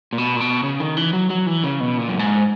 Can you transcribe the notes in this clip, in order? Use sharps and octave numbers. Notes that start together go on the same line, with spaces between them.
A#2
B2
A#2
B2
C#3
D#3
E3
F#3
F#3
E3
C#3
B2
A#2
F#2
G#2